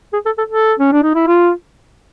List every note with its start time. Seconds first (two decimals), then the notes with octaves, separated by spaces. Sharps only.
0.13 G#4
0.25 A4
0.38 A4
0.50 A4
0.79 C#4
0.92 D4
1.03 D#4
1.15 E4
1.27 F4